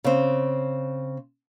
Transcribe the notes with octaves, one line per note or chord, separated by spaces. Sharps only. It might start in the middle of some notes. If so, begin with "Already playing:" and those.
C#3 C4